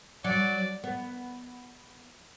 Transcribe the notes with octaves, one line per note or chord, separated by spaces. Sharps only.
F#3 D5
B3